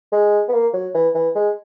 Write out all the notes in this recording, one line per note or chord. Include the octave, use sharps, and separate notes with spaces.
G#3
B3
A#3
F#3
E3
E3
G#3